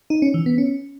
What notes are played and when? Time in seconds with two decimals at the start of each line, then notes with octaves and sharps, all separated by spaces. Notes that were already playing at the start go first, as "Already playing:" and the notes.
0.10 D#4
0.22 C#4
0.34 E3
0.46 B3
0.58 C#4